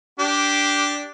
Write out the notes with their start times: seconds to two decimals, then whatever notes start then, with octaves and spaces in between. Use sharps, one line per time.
0.19 D4 G4